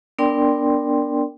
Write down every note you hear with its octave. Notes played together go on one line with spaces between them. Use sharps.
B3 D4 A#4 D5 G5 C6